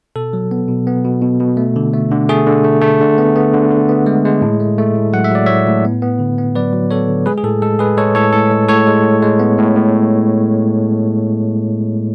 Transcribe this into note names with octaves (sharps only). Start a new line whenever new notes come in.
B2 A4
F#3
B3
B2
B3
B2
B2
B2
A3
D3
A3
D3
A3 G#4
D3
A3
A3
D3
B3
B3
D3
D3
B3
G#3
G#3
A2
A3
A3
A2
F#3 F#5
E5
F#3 D5
A2 C#5 E5
A2
B3
B3
D3
B3
F#3 B4 D5
F#3
B3 A4 C#5
D3
G#3 G#4 B4
G#4
A2 A4
G#3 A4
G#3 G#4 B4
G#3 A4 C#5
A2 A4 C#5
A2 A4
G#3
A2 A4 C#5
G#3
A2
G#3
B3
A2
A2